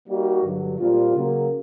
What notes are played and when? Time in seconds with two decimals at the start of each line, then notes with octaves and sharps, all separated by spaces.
0.08 G3 A#3 D#4 F#4
0.43 G2 D3 F#3
0.79 A#2 G3 C4 F4
1.15 C#3 F#3 A#3